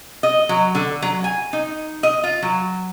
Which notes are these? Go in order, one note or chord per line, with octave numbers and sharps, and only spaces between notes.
D#5
F#3
D3
F#3
G#5
D#4
D#5
F4
F#3